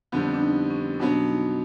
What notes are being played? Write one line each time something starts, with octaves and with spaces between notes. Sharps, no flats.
F2 D3 G3 B3 G4
D4
D#4
C#4
C#4
B2 F#3 B3 D4
D#4